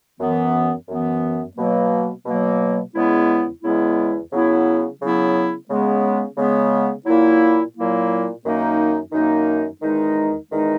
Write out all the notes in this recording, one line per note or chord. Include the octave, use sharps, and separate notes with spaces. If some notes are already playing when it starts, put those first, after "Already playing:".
F#2 E3 B3
F#2 E3 B3
B2 F#3 A#3
B2 F#3 A#3
E2 C#3 G#3 B3 E4
E2 C#3 G#3 B3 E4
C#3 F#3 B3 E4
C#3 F#3 B3 E4
C#3 G#3 B3
C#3 G#3 B3
A#2 F#3 A#3 E4
A#2 F#3 A#3 E4
F#2 D#3 A#3 D#4
F#2 D#3 A#3 D#4
E2 D#3 G#3 D#4
E2 D#3 G#3 D#4